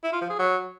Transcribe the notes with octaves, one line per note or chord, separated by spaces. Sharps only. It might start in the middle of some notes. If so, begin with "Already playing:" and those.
E4
F4
F3
G#4
F#3